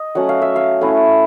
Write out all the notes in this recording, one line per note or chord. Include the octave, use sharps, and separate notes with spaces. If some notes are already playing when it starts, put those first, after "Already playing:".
Already playing: D#5
F#3 A3 C#4 F#5
F5
E5
F5
A3 C#4 E4 F#5